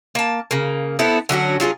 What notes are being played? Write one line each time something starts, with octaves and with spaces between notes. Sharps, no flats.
A#3 A5
C#3 A#3
B3 C4 E4 A4
D3 F#3 C#4 F#4
F#3 F4 G4 G#4